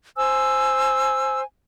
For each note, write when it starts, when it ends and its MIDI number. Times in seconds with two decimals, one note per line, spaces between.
0.16 1.41 72
0.16 1.41 80
0.16 1.41 88